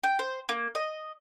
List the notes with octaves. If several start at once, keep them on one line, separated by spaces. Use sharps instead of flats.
G5
C5
A#3
D#5